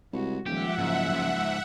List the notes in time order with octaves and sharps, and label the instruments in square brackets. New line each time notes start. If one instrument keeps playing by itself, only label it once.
[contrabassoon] C2 [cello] G#3 F#4
[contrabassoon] D#1 [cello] F3 G#3 [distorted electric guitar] G4 [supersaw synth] E5 F#5
[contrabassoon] F#1 [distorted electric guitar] G#2
[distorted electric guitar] C#2 G#2